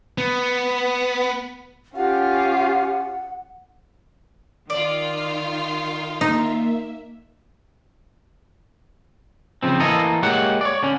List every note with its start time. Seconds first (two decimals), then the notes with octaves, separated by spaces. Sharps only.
0.18 B3
1.96 C#4 F4 G4 F#5
4.70 D#3 F4 D5
6.21 A#3 D#4 E5
9.63 C#3 F3 C4
9.80 E3 A3 A#3 A4 D#5 A#5
10.23 G#3 A#3 G4 C#5 F#5
10.61 C#5 D5
10.83 D3 C#4